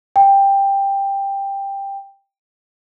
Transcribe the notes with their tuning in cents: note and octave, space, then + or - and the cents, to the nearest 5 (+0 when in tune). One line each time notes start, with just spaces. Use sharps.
G5 +10